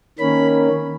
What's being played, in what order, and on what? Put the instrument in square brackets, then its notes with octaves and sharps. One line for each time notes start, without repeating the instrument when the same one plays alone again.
[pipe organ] D#3 A#3 C#4 B5